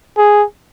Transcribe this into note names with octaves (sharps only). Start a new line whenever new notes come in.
G#4